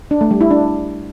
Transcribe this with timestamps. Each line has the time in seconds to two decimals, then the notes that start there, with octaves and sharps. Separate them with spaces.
0.11 D4
0.21 A3
0.31 G3
0.41 E4
0.51 D4